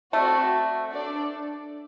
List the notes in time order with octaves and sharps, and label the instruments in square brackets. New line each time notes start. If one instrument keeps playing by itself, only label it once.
[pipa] A3 [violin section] C4 F#4 A4 D5
[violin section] D4 A4 D5